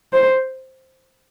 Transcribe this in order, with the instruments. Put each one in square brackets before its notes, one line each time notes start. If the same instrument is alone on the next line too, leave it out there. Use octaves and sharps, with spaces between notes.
[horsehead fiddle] C5